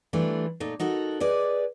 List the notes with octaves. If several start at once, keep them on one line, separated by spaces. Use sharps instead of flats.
E3 G3 A3 D4 F4
A#2 A3 D#4
D#4 F#4 A4 A#4
G#4 B4 D5 D#5